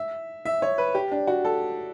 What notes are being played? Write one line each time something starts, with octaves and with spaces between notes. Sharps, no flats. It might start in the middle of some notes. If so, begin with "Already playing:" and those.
Already playing: E5
E5
C#5
B4
G4
D4
F#4
A4